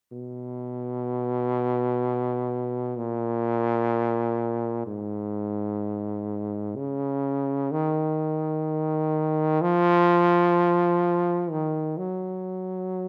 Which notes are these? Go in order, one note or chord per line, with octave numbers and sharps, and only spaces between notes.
B2
A#2
G#2
C#3
D#3
F3
D#3
F#3